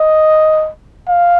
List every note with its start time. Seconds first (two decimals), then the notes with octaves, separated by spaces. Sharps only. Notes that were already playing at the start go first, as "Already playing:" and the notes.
Already playing: D#5
1.09 F5